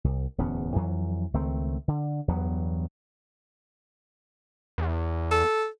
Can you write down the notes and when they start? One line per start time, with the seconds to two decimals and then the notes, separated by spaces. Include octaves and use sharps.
0.04 C2
0.38 D1 E2 B3 C#4
0.76 F2 E3 F#3
1.34 C#2 D#3 A3 C4
1.88 D3
2.28 E2 G2 F#3 B3
4.78 E2
5.31 A4